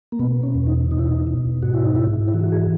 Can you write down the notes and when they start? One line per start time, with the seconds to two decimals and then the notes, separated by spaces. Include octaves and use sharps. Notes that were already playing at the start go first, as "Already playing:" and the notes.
0.12 A#3
0.19 B2 B3
0.43 C#4
0.55 E2
0.67 D#4
0.91 B2 D#4
0.99 E4
1.08 D#4
1.27 B2
1.63 G#2 F#4
1.74 E4
1.85 D#4
1.96 G#2 E4
2.28 E4
2.34 E3 F#4
2.44 F#4
2.52 G#4